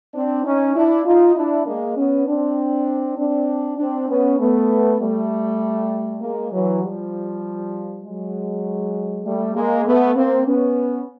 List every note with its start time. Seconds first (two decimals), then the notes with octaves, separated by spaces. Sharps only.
0.15 C4 D4
0.45 C#4 D#4
0.76 D4 E4
1.06 D#4 F4
1.36 D4 E4
1.66 G#3 A#3
1.97 B3 C#4
2.27 C4 D4
3.18 C4 D4
3.78 C4 D4
4.09 B3 C#4
4.40 A3 B3
5.00 G3 A3
6.21 G#3 A#3
6.52 E3 F#3
6.83 F3 G3
8.04 F#3 G#3
9.25 G3 A3
9.55 G#3 A#3
9.86 A3 B3
10.15 A#3 C4
10.46 B3 C#4